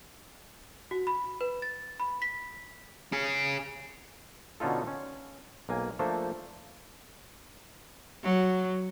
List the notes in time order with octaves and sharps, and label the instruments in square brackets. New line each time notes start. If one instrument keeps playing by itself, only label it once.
[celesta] F#4
B5
B4
A6
B5
B6
[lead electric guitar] C#4 G#4
[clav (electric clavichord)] B2 D3 C#4 D#4 F4 A4
C#4
B1 A#3 G#5
F3 A3 A#3 D4 A4 C5
[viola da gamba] F#3